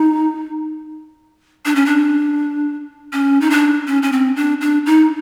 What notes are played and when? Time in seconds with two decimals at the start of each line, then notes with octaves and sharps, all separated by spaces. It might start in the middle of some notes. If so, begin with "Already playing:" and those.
Already playing: D#4
1.65 D4
1.75 C#4
1.86 D4
3.13 C#4
3.41 D#4
3.50 D4
3.87 C#4
4.03 C#4
4.12 C4
4.36 D4
4.61 D4
4.86 D#4